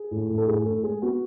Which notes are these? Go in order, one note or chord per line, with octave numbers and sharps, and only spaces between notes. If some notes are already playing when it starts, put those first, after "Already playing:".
Already playing: G#4
A2
A2
A4
A2 G#4
A2 A4
G#3 G#4
B3 F#4